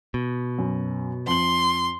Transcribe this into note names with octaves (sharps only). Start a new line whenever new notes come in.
B2
F#2
F2 C6 F#7